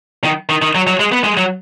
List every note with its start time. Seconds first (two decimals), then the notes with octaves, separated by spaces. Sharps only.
0.24 D#3
0.49 D#3
0.62 D#3
0.75 F#3
0.87 F#3
1.00 G#3
1.12 B3
1.24 G#3
1.37 F#3